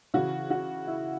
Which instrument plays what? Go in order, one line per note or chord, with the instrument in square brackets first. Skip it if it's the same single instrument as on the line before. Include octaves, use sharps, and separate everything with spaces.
[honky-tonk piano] C#3 E3 F#4
F#4
E4